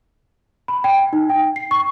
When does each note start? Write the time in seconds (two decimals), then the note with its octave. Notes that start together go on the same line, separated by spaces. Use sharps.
0.68 B5
0.84 G5
1.13 D#4
1.29 G5
1.56 C7
1.71 C#6